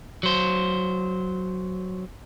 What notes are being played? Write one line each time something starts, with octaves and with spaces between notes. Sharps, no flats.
F#3 C5